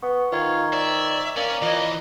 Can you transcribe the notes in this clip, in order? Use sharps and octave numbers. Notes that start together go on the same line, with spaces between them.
B3 C#6
D#3 F4 C5 C#6 G#6
D5 E5
A#3 C#4 D5
E3 F4 C5 D#5